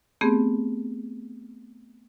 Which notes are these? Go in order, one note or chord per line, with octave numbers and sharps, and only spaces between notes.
A3 B3 C4 G4 G#4